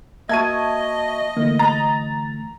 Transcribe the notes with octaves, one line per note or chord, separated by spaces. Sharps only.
A#3 F#4 D#5 E5 A5 C#6 G#6 D#7
D3 E3 A3 A#3
A#5 A6